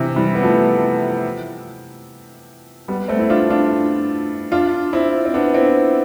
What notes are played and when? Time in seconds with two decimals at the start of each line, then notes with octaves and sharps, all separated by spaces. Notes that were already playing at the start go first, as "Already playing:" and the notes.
Already playing: C3 E3
0.16 E3 G3
0.35 B3
0.43 F3 A3
2.88 G3 B3
3.08 A3 C4
3.19 E4
3.30 D4 F4
3.50 D4 F4
4.52 D4 F4
4.93 C4 E4
5.25 C4
5.34 B3 D4
5.54 C4 E4